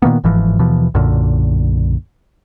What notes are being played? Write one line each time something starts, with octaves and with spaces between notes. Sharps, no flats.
A#2 D#3 A#3 B3
G1 G#2 E3 F3
D#2 B2 E3 F3
B1 F#2 A#2 D3